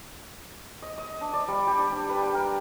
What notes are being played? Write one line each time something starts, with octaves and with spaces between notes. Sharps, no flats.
D#5
D#5
D4
D5
G3
G4
D4
D4
B4
G5
A#4